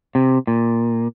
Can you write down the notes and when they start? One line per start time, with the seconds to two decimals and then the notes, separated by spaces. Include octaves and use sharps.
0.15 C3
0.47 A#2